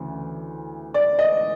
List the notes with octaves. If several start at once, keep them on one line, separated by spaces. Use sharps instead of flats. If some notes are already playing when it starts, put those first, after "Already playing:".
Already playing: D2 C#3 E3
D5
D#5